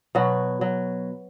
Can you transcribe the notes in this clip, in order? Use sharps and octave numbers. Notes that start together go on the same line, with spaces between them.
B2 F#3 F#4
F#3